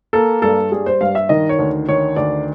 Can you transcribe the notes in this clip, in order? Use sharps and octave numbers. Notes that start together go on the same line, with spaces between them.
A#3 A4
G2 A4
G3 G#4
C5
G2 F5
E5
D#3 D#5
C#5
D2
D#3 C#5
D2 D5